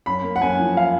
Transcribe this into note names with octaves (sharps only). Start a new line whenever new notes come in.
F#2 B5
A#3
F#5
F#2 G#5
F3
F5